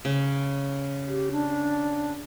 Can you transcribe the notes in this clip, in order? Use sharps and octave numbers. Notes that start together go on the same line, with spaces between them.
C#3
G4
D4